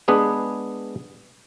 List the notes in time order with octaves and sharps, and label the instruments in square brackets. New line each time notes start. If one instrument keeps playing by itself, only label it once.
[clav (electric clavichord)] G#3 B3 D4 G#4 B4